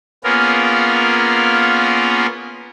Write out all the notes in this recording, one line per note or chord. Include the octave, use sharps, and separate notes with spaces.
A#3 B3 C#4 F4 G#4 A#4